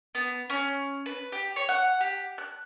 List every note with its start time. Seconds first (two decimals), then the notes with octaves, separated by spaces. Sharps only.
0.15 B3
0.50 C#4
1.06 B4
1.32 G4
1.56 C#5
1.69 F#5
2.01 G4
2.38 F#6